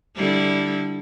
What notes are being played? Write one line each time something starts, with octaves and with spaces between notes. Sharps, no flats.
D3 G3 E4